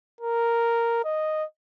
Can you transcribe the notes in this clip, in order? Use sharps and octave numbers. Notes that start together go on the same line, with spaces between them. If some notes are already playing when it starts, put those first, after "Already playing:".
A#4
D#5